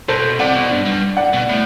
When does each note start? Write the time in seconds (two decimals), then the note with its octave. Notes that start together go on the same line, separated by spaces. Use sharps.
0.08 B2 A4 C5
0.39 C3 D5 F#5
0.55 B2
0.71 G2
0.86 G2
1.17 D5 F#5
1.33 B2
1.49 A2